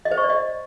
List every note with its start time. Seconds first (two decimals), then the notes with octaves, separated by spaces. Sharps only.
0.05 D#5
0.11 C5
0.18 C#6
0.24 D5
0.30 D#5